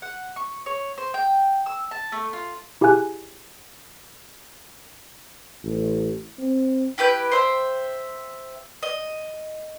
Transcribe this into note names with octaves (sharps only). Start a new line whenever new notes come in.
F#5
C#6
C#5
C5
G5
E6
A5
A3
F4
E4 G4 G#4 F5 G#5 F#6
A1
C4
E4 G4 B4 G6
C5 E5 G5
D#5